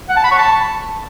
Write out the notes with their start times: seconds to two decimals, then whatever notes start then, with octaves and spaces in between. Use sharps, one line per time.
0.09 F#5
0.16 A5
0.24 B5
0.31 C#6
0.39 A5